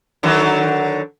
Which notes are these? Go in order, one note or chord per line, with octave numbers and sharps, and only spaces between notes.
D3 D#3 F#3